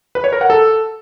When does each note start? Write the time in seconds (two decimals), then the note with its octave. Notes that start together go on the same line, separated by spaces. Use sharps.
0.15 B4
0.24 C#5
0.32 A#4
0.41 F#5
0.50 A4